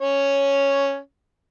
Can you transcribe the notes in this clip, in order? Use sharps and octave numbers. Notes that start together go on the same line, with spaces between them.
C#4 C#5